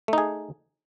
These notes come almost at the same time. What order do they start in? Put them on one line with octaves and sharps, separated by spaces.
A3 D#4 G#4